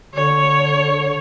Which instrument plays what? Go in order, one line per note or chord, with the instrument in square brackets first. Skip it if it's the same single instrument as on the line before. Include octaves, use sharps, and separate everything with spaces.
[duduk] D3 [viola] C#5